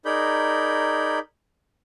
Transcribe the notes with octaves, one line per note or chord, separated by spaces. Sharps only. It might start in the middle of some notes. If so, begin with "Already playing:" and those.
D#4 G#4 A#4 D5 B5 G6